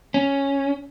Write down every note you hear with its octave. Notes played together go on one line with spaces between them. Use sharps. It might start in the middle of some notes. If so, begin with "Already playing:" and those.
C#4